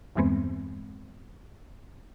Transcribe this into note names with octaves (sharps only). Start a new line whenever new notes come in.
E2 G2 E3 G#3 B3 C4